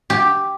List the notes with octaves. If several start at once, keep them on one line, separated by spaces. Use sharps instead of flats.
G4